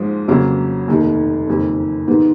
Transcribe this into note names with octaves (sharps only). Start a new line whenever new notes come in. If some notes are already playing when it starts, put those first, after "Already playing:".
Already playing: G#2 F3 G#3
F2 C#3 F#3 A#3
F1 D#2 D#3
F#1 F2 D#3
G#2 D#3 G#3 B3 D#4